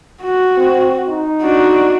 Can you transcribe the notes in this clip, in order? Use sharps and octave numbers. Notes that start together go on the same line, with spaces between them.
F#4
C4
D#4
D4 F#4